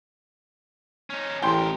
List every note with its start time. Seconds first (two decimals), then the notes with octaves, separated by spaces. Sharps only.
1.10 C#4 D#4
1.42 A1 D2 A#4 G5 C6